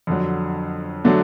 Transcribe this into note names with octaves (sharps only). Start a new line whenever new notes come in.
F2 D3 F#3
D3 F#3 A3 D4